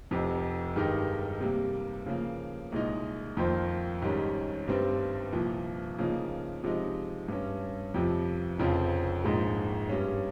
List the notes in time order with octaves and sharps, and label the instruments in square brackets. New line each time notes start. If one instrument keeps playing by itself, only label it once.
[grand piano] F1 F2 C3
G2 D#3 G#3 D#4 G4
C3 G3 A#3
C#3 F3 A#3
C2 A#2 G#3 D#4
F2 D#3 A#3 F4 C5
G#1 G#2 G3 C#4
G1 G2 G3 C4
C2 A#2 F3
C#3 F3 A#3 D#4
C3 F3 G#3 D#4
G2 G3 C#4
F2 C3 F3
F1 F2 C#3 F3 C4
A#1 G#2 F3 G#3
G2 G3 C#4